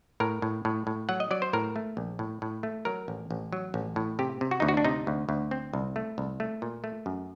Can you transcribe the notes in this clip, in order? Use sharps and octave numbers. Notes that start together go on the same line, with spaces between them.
A2 A#4
A2
A2
A2
F#3 F#5
D#5
F#3 D5
C5
A2 A#4
A3
A#1
A2
A2
A3
F#3 A#4
A1
A1
F#3
A1
A2
C3 G4
C3
F#4
D2 D#4
F#4
D4
C3 D#4
D2
D2
C4
C2
A3
C2
A3
A#2
A3
F#2